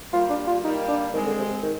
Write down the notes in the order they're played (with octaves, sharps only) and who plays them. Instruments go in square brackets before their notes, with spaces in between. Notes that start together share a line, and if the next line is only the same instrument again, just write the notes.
[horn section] G3 A#3 [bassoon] F4
[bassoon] D4
F4
[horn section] G3 A#3 [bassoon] D#4
[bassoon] D4
[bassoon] D#3 [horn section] G#3 C4
[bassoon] D3
C3
D#3